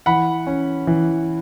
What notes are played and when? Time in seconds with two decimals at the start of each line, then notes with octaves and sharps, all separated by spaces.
0.06 E3 F#5 B5
0.47 C#4
0.87 E3